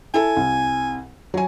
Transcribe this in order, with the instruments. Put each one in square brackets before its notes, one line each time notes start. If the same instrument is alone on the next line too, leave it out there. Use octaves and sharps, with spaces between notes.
[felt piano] E4 A4 [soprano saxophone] G#5
[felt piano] C2
F#3 G#5